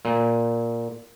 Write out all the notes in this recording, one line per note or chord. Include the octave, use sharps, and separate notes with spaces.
A#2